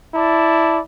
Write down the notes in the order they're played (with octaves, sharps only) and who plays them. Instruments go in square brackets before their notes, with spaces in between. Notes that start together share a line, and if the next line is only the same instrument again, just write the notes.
[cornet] E4 [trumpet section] D5 A5